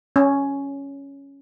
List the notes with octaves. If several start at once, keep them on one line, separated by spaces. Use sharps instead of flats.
C#4